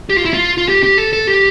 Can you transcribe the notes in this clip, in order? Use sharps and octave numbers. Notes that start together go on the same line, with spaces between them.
G4
F4
E4
F4
F4
G4
G4
A4
A4
G4